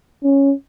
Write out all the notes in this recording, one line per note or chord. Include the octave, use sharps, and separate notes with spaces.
C#4